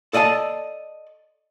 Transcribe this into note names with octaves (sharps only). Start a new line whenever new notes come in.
A4 D5 D#5 F#5 A5